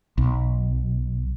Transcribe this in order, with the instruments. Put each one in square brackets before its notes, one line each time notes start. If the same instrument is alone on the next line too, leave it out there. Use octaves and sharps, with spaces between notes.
[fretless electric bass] B1